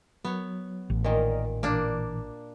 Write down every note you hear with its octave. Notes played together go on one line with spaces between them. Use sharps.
F#3 B3 C#5
A1
A#2 D#3 A#4 D5 D#5
A#2 E3 A#3 D4